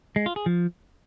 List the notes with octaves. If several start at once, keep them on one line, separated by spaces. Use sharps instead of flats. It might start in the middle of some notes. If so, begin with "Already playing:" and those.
G#3
F4
G#4
F3